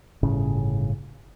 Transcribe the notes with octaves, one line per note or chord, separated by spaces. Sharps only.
G1 A2 C#3 C#4